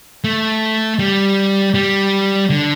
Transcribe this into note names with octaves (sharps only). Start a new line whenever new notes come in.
A3
G3
G3
D3